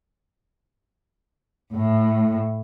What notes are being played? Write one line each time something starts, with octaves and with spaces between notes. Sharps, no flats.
A2